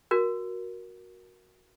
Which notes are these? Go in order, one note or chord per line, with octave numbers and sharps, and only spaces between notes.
F#4 A#4